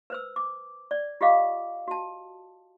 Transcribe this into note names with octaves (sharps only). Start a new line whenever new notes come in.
B4 C5 E6
D6
D5
F4 G4 D#5 F5 D6
F#4 A5